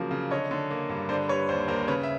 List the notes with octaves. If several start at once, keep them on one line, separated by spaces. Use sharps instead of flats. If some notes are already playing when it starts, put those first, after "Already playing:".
Already playing: C#3 F3 F#3 A#3
C#3
D3 C#5 D#5
D3
A#3
G2
D3 C5 D5
G3 B4 C#5
D#2 C5 D5
D#2 A#4 C5
C#3 B4 C#5
E5